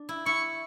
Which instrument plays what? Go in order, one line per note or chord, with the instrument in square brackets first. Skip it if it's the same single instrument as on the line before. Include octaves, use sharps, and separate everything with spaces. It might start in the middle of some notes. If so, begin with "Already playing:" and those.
Already playing: [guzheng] D4
E4
[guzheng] E4 [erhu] C#6